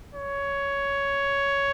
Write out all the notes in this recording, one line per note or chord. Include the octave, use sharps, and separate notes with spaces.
C#5